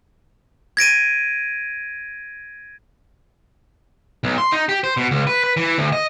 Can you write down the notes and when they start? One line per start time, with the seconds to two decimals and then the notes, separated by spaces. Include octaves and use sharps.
0.77 G#6 A#6 D7 D#7
4.24 B1
4.38 C6
4.52 D#4
4.69 G4
4.84 C5
4.97 B2
5.11 C#2
5.27 B4
5.44 B4
5.57 E3
5.78 D2
5.93 D#5